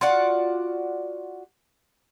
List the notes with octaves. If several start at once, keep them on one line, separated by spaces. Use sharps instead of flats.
F4 F#4 D5 F#5